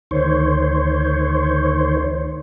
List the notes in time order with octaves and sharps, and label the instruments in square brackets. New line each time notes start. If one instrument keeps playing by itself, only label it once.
[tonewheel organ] D2 D#3 C5 C#5